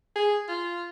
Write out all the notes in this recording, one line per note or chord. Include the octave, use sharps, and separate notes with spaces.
G#4
F4